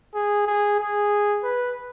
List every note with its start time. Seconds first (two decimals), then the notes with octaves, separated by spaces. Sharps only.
0.15 G#4
0.47 G#4
0.80 G#4
1.44 B4